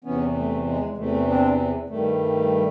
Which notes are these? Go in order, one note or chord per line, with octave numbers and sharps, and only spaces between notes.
E2 C3 E3 B3 C#4
A3
G#3
E2 C3 E3 A3
C4 D4
G2 D#3 G3 A3